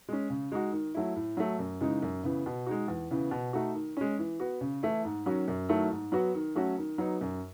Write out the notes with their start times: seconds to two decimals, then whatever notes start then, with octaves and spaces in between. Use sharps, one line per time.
0.08 G#3 C#4
0.30 C#3
0.52 G#3 D#4 F#4
0.72 D#3
0.95 F#3 A3 E4
1.16 A2
1.37 F#3 A3
1.59 F#2
1.81 C#3 E3 G#3 D#4
2.02 F#2
2.23 C#3 E3 B3
2.46 B2
2.67 G#3 D#4 F#4
2.88 E2
3.11 C#3 E3 B3
3.31 B2
3.53 A3 D#4 F#4
3.75 D#3
3.97 G#3 C#4
4.19 E3
4.40 B3 F#4
4.61 C#3
4.83 E3 A3 E4
5.05 G#2
5.26 D#3 F#3 C#4 F#4
5.48 F#2
5.69 D#3 F#3 A3 E4
5.91 G#2
6.12 F#3 B3 F#4
6.35 D#3
6.55 F#3 A3 C#4 F#4
6.78 D#3
6.98 F#3 B3 D#4
7.21 F#2